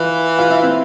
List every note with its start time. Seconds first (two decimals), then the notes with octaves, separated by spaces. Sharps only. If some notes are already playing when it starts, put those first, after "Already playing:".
Already playing: E3 F4
0.39 F4
0.50 E4
0.63 C4